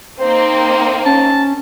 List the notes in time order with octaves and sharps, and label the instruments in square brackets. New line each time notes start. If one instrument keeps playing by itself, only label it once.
[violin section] A#3 C4 D#4 [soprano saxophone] C5
[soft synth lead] C#4 [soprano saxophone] A5